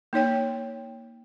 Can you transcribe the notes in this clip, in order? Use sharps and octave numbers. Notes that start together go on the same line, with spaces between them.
A#3 D#4 C#5 G5